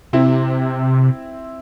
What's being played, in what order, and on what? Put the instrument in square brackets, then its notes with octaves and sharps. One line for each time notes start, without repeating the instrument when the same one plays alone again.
[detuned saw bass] C3 [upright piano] C4 E4